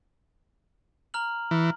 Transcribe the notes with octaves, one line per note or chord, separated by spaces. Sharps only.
A#5 F6 F#7
E3